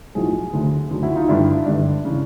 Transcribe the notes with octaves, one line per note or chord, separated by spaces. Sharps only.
B1 A2 F3 F#4 G#4
D2 D3 F#3
D2 D3 F#3
E4 F#4
D#4 F4
G1 G2 D3 G3 D4 E4
G1 G2 D3 G3 D4
C#3 E3